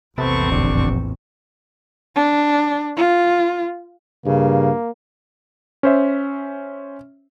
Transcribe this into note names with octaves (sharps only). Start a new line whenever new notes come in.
A#1 E2 A2 C3 B3 C4 A4 C#6
F1 D3
D4
F4
G2 C#3 A#3
C#4 C5 E5